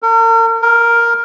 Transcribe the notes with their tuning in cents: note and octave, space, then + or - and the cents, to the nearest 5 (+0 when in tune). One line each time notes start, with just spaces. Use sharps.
A#4 -40
A#4 +5